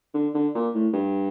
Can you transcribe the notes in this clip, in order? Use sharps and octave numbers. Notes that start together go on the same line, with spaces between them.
D3
D3
A#2
A2
G2